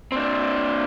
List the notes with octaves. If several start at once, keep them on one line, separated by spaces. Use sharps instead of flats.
C4 D4